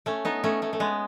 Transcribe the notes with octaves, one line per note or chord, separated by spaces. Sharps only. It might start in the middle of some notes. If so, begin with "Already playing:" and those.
A3 C#4
B3 D#4
A3 C#4
A3 C#4
A3
G#3 B3